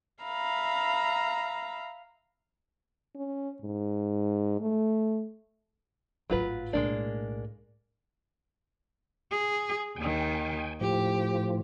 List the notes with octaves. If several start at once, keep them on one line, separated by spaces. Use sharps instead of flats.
E5 F5 A#5 B5
C#4
G#2
A3
G#1 A2 F#3 F4 B4
B1 A2 G#3 A#3 D4
G#4
D#2 D#3 G5 G#5
A2 F3 G4